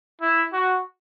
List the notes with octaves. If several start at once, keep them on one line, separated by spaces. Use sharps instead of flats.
E4
F#4